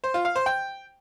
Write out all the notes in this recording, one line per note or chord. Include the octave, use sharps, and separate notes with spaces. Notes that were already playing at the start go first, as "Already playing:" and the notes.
C5
F4
F5
C5
G5